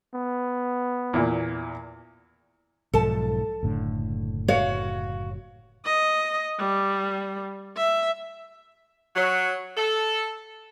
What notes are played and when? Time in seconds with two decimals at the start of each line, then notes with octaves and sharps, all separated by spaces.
0.15 B3
1.13 E2 A#2
2.94 B1 G#2 F3 A4 A5
3.63 F#1 A2 D3
4.48 F#4 C#5 F5
5.85 D#5
6.59 G3
7.76 E5
9.16 F#3
9.77 A4